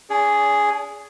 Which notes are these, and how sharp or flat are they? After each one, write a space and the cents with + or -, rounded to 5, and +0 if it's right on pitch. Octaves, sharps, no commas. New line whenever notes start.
D4 -45 G#4 +0 D5 -35